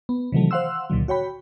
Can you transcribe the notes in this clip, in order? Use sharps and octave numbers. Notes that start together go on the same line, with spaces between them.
B3
C3 D#3 E3 F#3 A3
C5 F5 F#5 C6 E6
C#2 A#2 D3 D#3 F#3
F#4 C#5 G5 B5